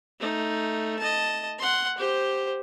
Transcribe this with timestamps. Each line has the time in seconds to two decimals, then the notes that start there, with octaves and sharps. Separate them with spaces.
0.19 A3 D#4
0.99 D#5 A5
1.59 F#5 C6
1.98 G4 C5